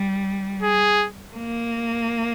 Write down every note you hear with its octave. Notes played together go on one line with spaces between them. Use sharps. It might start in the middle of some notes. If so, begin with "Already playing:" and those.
Already playing: G3
G#4
A#3